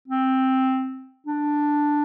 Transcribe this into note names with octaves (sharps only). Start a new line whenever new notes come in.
C4
D4